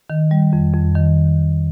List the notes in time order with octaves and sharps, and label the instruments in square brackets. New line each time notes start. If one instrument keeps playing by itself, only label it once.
[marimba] D#3
G3
F2
F2
D#3